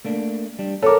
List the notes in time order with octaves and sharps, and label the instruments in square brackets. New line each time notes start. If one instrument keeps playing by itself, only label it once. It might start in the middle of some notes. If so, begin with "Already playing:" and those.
[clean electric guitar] A3 A#3 D4
G3 D4
[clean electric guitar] B3 [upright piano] A4 A#4 [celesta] C#5 D6